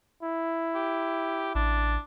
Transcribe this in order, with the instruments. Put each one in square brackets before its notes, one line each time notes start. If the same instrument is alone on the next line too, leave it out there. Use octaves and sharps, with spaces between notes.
[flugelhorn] E4
[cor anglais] G4
[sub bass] A1 [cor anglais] D4